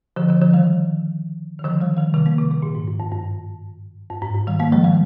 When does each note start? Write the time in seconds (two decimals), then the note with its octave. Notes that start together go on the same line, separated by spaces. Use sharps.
0.16 D3 F3
0.29 D3 F3
0.41 D3 F3
0.53 D#3 G3
1.59 D#3
1.64 D3 F3
1.81 D#3 G3
1.97 D#3 G3
2.14 C3 D#3
2.26 G3 A#3
2.38 C3
2.51 C3
2.62 A#2
2.75 G#2
2.88 G#2
3.00 G2
3.12 G2
4.10 G2
4.22 G#2
4.35 G#2
4.47 D#3 G3
4.60 G3 A#3
4.72 F3 G#3
4.84 D#3 G3